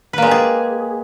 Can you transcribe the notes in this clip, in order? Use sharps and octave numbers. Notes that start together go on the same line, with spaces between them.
G#3 A#3 G4 G#4 B4